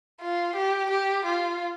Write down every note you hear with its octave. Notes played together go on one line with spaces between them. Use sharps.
F4
G4
G4
F4